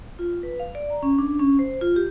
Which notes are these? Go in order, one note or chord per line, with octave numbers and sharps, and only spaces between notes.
F4
B4
F5
D5
A#5
C#4
D4
C#4
C5
F4
G4